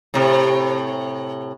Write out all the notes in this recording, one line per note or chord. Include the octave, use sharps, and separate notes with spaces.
A2 C3